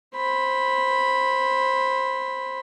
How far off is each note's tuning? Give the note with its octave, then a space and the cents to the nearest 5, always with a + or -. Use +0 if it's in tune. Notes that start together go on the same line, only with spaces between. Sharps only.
C5 +15 B5 +0